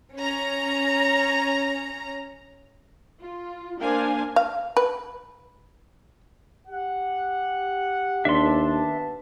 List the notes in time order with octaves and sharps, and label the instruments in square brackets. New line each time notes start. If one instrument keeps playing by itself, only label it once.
[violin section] C#4 A#5
[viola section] F4
A#3 D4 A#4 C5 F5 G#5
[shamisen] F5
B4
[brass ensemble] G4 F#5
[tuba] D#2 [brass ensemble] B3 A5 [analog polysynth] D4 [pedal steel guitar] E5 C6